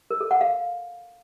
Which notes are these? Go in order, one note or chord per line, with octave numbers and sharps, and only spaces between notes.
A#4
A4
F#5
F5